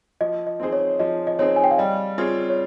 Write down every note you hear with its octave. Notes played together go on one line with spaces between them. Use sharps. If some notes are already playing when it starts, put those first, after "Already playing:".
F3 D#5
D#5
C4 D#4 G#4 C5
C#5
F3 D#5
D#5
C4 D#4 G#4 C5 C#5
G#5
G5
F5
G3 D#5
C4 F4 G#4 C#5
C#5